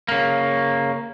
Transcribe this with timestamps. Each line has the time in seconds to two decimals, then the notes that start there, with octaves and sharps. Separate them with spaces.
0.08 C#3 A#3